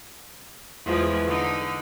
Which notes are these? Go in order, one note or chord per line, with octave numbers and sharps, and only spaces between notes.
E2 F3 G#3
D3 D#4